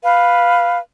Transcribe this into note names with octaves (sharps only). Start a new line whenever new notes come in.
B4 F5